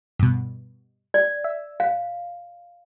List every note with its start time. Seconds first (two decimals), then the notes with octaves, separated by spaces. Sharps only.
0.19 G2 B2
1.14 D5
1.44 E5
1.80 F5